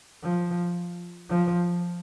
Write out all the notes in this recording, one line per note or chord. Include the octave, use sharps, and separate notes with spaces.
F3
F3